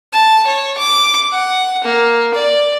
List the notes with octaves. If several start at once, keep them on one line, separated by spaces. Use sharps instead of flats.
A5
C#5
D6
F#5
A#3
D5